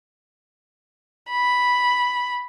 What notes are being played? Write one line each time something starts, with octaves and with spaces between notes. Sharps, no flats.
B5